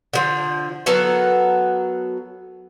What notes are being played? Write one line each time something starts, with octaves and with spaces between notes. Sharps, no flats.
D3 F3
F#3 B3 A4 A#4